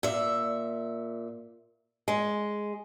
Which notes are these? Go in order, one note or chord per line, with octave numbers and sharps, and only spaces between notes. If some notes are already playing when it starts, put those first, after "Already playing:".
A#2 E5
G#3